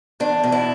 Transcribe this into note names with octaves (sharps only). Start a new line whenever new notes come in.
E2 D4
B2
E4